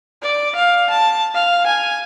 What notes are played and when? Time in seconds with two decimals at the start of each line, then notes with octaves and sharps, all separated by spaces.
0.23 D5
0.55 F5
0.90 A5
1.34 F5
1.67 G#5